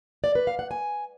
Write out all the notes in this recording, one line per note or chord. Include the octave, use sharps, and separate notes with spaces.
D5
B4
F5
F#5
G#5